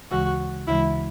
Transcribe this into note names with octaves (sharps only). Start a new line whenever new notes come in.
D2 C#3 E3 G#3 F#4
D2 C#3 E3 G#3 E4